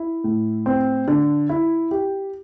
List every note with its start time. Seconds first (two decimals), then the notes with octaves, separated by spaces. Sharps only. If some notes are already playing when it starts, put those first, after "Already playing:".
Already playing: E4
0.24 A2
0.66 C4
1.08 D3
1.49 E4
1.91 G4